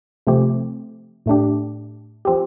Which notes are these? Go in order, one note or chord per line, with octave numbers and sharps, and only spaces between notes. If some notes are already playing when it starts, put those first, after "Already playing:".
C3 F3 A3 C4 G4
A2 A3 D4 G4
F3 C4 G4